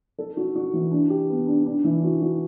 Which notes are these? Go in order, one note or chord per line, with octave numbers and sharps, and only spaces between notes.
A4
F#4
F#4
E3
D4
G4
B3
D4
D4
E3
F#4
F#4